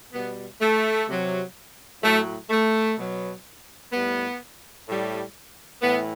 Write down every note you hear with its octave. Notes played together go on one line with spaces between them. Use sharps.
B2 G3 B3
A3
C3 F#3
A2 F#3 A3
A3
B2 F#3
A2 G3 B3
A2 G3
A2 E3 B3